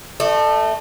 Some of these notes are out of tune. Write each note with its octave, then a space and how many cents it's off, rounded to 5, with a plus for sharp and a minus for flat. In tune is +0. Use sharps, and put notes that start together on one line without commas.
A3 +0 D5 +45